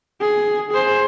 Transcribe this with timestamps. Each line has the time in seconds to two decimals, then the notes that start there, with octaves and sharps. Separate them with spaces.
0.21 G#4
0.72 G#4 C5